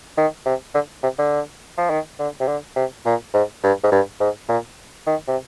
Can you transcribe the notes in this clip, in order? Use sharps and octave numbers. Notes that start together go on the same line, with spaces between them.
D#3
C3
D3
C3
D3
F3
D#3
D3
C3
D3
C3
A#2
G#2
G2
G#2
G2
G#2
A#2
D#3
C3